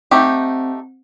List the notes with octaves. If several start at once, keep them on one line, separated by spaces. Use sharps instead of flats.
A3 C4 D#4 G4